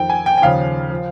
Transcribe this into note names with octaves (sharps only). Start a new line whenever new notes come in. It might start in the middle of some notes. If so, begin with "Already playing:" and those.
Already playing: F2 D#3 G5
G#5
G5
G5
D#2 C#3 F3 F5
F3